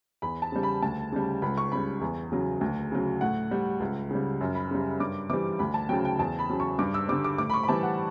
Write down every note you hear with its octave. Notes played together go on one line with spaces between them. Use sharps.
E2 B5
A5
C#3 G3
B5
D2 A5
C#3 G3
C#2 B5
C#6
C#3 G3 B5
E2
C#3 F#3
D2
C#3 F#3
A2 F#5
G3
C#2
C#3 G3
F#2
B5
C#3 G3
G2 D6
E3 G3 D6
D2 B5
A5
C#3 F#3 G5
G5
E2 A5
B5
C#3 F#3
C#6
G2 D6
E6
D3 G3 D6
D6
A2 D6
B5
C#6
B5
E3 G3 A5
F#5